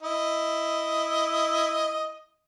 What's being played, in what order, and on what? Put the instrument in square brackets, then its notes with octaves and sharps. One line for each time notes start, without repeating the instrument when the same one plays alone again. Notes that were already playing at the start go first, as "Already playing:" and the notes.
[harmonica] E4 D#5